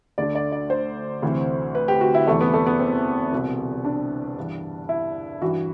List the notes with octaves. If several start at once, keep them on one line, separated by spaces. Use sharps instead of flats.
D2 D3 D5
D5
D5
C5
D2 C3 E3
B4
G4
F#4
E4
E2 C3 E3 A3
B3
A3
B3
C4
C2 B2
D4
G2 E3
E4
G2 E3 F#4